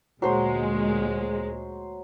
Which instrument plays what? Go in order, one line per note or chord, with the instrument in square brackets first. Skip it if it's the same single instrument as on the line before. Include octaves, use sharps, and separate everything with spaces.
[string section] D2 A#2 G#3 [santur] F#3 C5 D#6